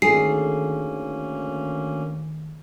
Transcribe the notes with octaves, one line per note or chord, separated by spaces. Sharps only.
D2 D#3 A3 A#3 C#4 G#4 C7